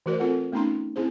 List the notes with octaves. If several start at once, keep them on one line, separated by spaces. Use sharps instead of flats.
E3 A3 F#4 A#4 C5 D5
C4 F4 A4 A#4 F#5
A3 B3 C#4 D#4 A#5 C6
C4 E4 G#4 C5